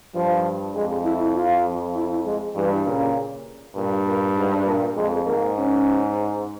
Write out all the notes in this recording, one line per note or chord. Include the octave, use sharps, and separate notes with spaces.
G2 F3
F2 G#3
E4
F4
E4
G#3
G2 E3
A#2 C#3
G2 A#2
A#2
G#2
A#2
F2 G#3
G#2 A#3
C#4